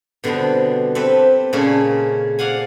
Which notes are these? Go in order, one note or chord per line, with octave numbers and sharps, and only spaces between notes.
B2 D3 G3 B3 C4
C4 G4 A4 B4 E5
A#2 C#3 G#3 C#4 A4
D5 F5 F#5 G#5